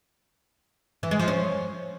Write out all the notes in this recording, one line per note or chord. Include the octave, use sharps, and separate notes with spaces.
E3
G#3
F3
C#4